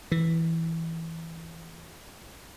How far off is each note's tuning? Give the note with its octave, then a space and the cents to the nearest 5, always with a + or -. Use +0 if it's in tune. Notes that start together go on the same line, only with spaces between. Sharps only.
E3 -5